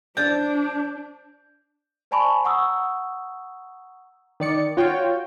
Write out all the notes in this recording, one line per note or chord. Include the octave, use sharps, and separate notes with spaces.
D4 C5 D5 G6
C5 D5 G#5 A5 B5 C#6
F#5 A#5 C#6 D#6 E6
D#3 D5 C#7
F4 F#4 C#5 G5